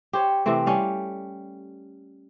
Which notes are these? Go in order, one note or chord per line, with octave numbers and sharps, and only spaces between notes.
G4 C5 C#5
C3 E3 A3 C4
G3 C#4 D5 F5